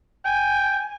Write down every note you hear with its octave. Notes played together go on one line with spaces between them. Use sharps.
G5 G#5